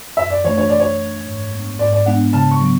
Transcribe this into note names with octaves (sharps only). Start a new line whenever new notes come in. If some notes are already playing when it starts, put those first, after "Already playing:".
F#2 E5
D5
E3 A3 D4 C#5
C#5
F#2 D5
C#5
E3 A3 D4
G#2
G#3 B3 D4
G#2 D5
D5
G#3 B3 D4 F#5
C#3 A5
C#6
F#3 B3